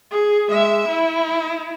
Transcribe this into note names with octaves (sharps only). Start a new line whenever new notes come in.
G#4
G#3 E5
E4